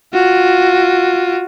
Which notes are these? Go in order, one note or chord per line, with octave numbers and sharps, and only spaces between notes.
F4 F#4